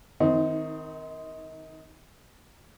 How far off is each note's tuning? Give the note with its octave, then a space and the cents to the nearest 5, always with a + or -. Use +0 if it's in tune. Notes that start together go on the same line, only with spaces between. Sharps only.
D#3 +5 C4 -15 D#4 +35